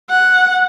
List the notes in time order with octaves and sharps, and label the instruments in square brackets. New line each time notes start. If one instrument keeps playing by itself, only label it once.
[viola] F#5